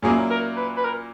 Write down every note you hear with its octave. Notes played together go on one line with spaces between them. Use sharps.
A#2 F#3 A#3 C#4 E4 G#4
A#4
B4
B4
A#4